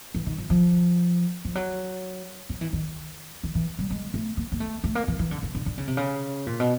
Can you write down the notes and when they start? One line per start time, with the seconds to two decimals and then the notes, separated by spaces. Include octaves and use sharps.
0.15 E3
0.26 D#3
0.38 F3
0.50 F3
1.45 F3
1.55 F#3
2.49 F3
2.61 E3
2.73 D#3
3.44 D#3
3.55 E3
3.79 G3
3.90 G#3
4.14 A3
4.37 A#3
4.52 A#3
4.60 A3
4.84 A3
4.95 A#3
5.08 E3
5.19 E3
5.31 D3
5.43 C#3
5.55 D3
5.66 D3
5.78 C#3
5.88 C3
5.97 C#3
6.46 A#2
6.60 B2